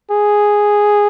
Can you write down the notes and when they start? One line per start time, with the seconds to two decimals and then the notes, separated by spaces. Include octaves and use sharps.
0.11 G#4